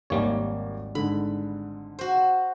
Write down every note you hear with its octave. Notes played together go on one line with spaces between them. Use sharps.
G#1 D#2 G3 A#3 D#4 C#5
G#2 D3 B5
F#4 C5